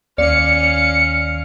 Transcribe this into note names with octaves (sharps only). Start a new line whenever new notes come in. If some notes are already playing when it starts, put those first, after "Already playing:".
D#2 C#4 D5 F5 C#7